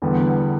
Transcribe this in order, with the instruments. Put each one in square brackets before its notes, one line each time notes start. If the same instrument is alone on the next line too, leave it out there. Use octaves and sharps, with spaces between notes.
[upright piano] E2 D3 G3 B3